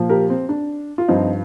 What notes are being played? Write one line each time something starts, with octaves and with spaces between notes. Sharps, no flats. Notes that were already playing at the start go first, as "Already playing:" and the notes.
Already playing: A#2 F3
G4 A#4
C4
D4
F4
G2 F3 C4 D#4